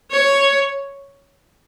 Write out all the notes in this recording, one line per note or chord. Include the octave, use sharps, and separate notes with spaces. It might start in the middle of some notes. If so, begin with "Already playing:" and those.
C#5